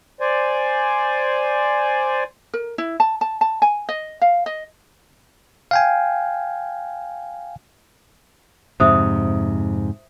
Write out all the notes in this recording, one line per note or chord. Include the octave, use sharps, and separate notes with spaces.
C5 D5 G#5
A#4
E4
A5
A5
A5
G#5
D#5
F5
D#5
F5 G5 G#5
F2 G#2 C3 C5 E5 D#6